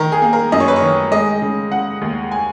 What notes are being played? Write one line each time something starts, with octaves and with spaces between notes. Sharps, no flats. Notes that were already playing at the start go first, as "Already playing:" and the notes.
Already playing: D#3 A#4
G#4
A#3
A#4
F#2 D#5
C#5
B4
C#5
D#3
G#3 D#5
C#3
C#3 F#5
D#2
G#5